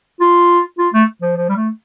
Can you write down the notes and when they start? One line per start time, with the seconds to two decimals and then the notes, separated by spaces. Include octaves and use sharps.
0.20 F4
0.78 F4
0.93 A3
1.22 F3
1.36 F3
1.49 G3
1.56 A3